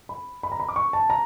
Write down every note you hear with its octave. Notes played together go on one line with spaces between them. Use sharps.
B5
B5
A#5
B5
D6
C#6
A5
A#5